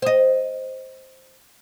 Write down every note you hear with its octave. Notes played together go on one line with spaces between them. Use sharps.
C5 D#5